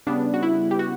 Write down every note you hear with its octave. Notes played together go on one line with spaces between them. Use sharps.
C#3 G3 B3 D4
F#4
E4
G4
F#4